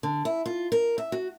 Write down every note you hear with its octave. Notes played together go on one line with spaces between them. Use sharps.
D3
E4
F4
A#4
E5
F#4